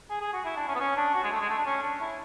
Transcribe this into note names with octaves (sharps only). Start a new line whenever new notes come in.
G#4
G#4
F#4
E4
D4
C#4
B3
C#4
D4
F#4
G#3
A3
G#3
A3
D4
C#4
D4
E4